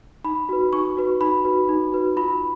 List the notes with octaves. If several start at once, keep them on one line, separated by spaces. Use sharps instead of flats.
D#4 B5
F#4 B4
D#4 C#6
F#4 B4
D#4 B5
F#4 B4
D#4
F#4 B4
F4 B5